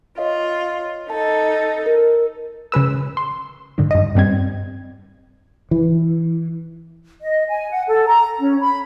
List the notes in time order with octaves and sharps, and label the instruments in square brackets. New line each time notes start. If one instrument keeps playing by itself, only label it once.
[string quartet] F4 [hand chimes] C#5 D#5 F5
[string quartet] D#4 A4 [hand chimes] A5
[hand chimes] A#4
[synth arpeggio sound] C#3 G#3 B4 E6
C6
G#2 D3 D#3
G2 D#5
G2 G3 C4 G#6
[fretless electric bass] E3
[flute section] D#5
G#5
F#5
A4
A#5
C#4
B5